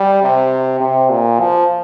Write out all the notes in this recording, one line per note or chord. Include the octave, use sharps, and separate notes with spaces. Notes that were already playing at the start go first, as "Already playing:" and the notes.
Already playing: G3
C3
C3
A#2
F3